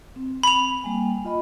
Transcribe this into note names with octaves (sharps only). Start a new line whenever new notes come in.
C4
B5 F7
G3 A#3 G#5
F4 D#5 B5